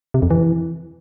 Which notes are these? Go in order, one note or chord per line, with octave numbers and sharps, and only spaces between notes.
C3
F2
E3